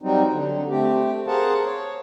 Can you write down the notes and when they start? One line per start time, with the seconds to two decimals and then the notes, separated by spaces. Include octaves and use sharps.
0.02 F#3 G3 C4 D#4
0.32 D3
0.69 A3 C4 G4
1.27 G#4 A#4 C5 F5 F#5 A5
1.66 C#5